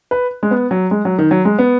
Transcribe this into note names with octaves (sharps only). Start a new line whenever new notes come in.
B4
G#3
B3
F#3
G#3
F#3
D#3
F#3
G#3
B3